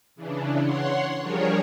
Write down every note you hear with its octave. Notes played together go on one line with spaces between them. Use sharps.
C#3 E3 D4
C#5 F#5 C6
F3 G3 D4 G#4 A#4 C#5